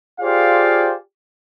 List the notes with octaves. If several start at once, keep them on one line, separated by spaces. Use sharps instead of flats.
F4 G4 G#4 C5 D5 F5